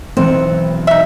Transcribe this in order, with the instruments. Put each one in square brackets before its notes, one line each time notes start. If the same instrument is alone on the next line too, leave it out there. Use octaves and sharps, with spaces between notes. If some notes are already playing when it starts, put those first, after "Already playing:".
[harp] B1 E3 C#7 [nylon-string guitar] C4
[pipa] D#4 E5